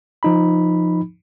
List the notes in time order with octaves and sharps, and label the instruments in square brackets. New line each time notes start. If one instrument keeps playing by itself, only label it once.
[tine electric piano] F3 D#4 B5